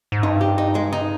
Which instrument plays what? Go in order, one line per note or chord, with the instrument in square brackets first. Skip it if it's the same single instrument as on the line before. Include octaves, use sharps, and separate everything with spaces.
[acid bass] G#2
[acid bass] G2 [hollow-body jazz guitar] D#4
[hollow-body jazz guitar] G4
D#4
G#3
D#4